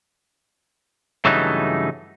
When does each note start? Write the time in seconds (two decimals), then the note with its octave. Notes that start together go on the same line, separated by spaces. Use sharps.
1.25 G2 C#3 E3 F#3 A3 D#4